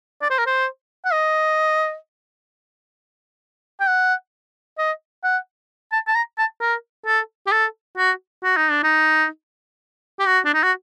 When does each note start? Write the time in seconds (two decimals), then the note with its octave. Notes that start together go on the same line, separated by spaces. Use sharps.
0.22 D5
0.30 C5
0.38 A#4
0.46 C5
1.05 F#5
1.13 D#5
3.80 G5
3.87 F#5
4.78 D#5
5.24 F#5
5.92 A5
6.07 A5
6.15 A#5
6.38 A5
6.60 A#4
7.06 A4
7.47 G4
7.52 A4
7.97 F#4
8.43 F#4
8.57 D#4
8.70 D4
8.84 D#4
10.19 G4
10.26 F#4
10.45 D4
10.54 D#4
10.63 F#4